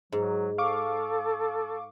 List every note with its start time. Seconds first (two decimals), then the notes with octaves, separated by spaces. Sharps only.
0.12 G#2 F#3
0.58 A4 F5 C#6 D6